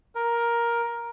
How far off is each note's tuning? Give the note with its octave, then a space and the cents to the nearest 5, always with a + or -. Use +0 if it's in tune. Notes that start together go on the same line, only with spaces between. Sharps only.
A#4 +10